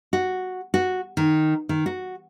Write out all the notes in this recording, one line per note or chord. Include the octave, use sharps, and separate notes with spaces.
F#4
F#4
D#3
D#3
F#4